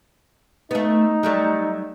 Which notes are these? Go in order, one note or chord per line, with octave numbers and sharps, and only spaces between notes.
A3 B3 D#4
F#3 G3 A3